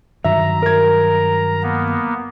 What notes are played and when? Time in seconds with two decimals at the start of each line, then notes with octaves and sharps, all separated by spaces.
0.24 G2 D#3 F#3 E5 A#5
0.62 A#4 G#6
1.63 A#3 B3